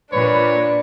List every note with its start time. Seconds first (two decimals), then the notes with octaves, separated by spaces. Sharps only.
0.12 A#2 D4 B4 C#5